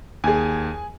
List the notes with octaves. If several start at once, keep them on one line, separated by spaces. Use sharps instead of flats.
D#2 G#4 G#5